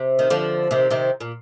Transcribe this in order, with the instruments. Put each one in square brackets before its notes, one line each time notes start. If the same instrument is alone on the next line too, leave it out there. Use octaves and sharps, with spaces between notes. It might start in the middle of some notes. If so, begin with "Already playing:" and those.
Already playing: [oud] C3
D#3
D3 F3
C3 D#3
C3 D#3
A#2